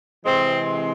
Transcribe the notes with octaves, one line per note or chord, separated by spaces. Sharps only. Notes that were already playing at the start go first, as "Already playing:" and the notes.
C3 E3 G#3 C4